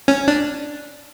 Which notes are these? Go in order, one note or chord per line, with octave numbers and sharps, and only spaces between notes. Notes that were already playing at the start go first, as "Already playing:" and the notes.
C#4
D4